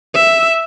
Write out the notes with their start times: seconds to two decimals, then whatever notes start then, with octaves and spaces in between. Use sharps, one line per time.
0.14 E5